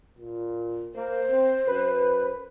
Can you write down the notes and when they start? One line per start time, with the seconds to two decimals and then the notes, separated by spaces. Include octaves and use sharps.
0.18 A#2
0.95 A#3 C5
1.30 C4
1.67 F#2 B4